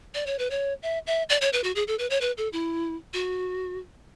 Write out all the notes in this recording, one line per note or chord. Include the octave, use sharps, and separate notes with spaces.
D5
C#5
B4
C#5
E5
E5
D5
C#5
B4
F#4
G#4
A4
B4
C#5
B4
A4
E4
F#4